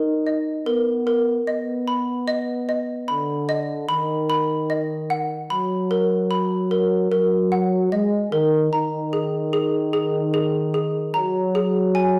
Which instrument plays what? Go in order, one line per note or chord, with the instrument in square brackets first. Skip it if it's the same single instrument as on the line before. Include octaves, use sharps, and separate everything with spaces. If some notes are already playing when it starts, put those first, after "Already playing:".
Already playing: [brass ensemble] D#4 [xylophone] A#4
[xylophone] D#5
[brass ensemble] B3 [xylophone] A#4
[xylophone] A#4
[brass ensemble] B3 [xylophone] D#5
[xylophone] B5
D#5
D#5
[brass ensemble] D3 [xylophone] B5
[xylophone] D#5
[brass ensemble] D#3 [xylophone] B5
[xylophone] B5
D#5
F#5
[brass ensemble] F#3 [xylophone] B5
[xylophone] A#4
B5
A#4
[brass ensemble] F#3 [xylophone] A#4
[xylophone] F#5
[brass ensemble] G#3 [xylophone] D#5
[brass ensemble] D#3 [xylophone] A#4
[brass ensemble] D#3 [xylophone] A#5
[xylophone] G#4
G#4
G#4
G#4
G#4
[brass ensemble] F#3 [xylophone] A#5
[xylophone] G#4
G#5